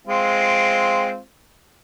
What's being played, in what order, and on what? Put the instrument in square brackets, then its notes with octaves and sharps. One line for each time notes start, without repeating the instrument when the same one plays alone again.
[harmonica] G#3 C4 F4